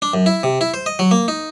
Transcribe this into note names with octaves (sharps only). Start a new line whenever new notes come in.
D4
F#2
E4
C3
E4
C5
D#5
F#3
A#3
D#4